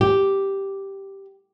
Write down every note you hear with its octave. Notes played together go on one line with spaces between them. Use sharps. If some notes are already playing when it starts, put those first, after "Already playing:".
G4